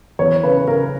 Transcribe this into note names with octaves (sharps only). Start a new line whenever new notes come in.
E2 C#5
C#3 B4
C#3 A#4